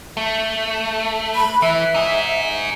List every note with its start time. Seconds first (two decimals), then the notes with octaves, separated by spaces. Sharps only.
0.17 A3
1.35 B5
1.62 E3 E5
1.94 D#4 G#4